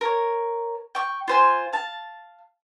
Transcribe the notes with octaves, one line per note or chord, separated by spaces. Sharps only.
A#4 C#5
G5 C#6
F4 C5 G#5
F5 A5